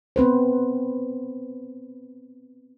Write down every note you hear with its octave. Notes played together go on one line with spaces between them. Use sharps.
B3 C4 B4 C5